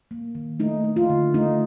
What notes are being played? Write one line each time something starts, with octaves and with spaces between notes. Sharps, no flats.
A#3
D#3
A3 D#4
A3
F4
D3
A3 D#4